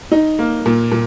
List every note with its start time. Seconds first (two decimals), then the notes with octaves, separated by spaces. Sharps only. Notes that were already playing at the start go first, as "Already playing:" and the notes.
0.12 D#4
0.39 A#3
0.66 A#2
0.91 A#2